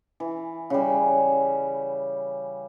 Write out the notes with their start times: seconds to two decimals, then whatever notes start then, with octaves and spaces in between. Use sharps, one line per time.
0.20 E3
0.70 C#3 G3